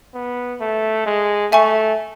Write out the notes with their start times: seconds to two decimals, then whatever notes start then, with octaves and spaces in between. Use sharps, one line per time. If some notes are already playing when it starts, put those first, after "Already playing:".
0.14 B3
0.60 A3
1.06 G#3
1.52 A3 E5 G#5 C#6